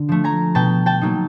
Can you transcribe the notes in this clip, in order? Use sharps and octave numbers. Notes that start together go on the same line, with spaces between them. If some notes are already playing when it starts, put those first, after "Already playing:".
Already playing: D3
F3 A3
G#5 A#5
B2 G5 A5
G5 A5
F#3 A#3 D#4